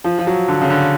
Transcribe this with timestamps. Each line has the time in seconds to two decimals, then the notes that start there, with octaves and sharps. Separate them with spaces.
0.04 F3
0.19 F3
0.27 F#3
0.48 D3
0.61 C#3
0.70 D3